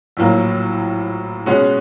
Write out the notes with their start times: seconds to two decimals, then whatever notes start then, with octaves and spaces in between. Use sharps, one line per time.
0.17 A#1 A2 F#3 A#3
1.46 B2 G#3 C#4 F#4